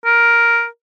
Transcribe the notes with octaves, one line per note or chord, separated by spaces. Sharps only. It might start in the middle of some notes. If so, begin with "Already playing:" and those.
A#4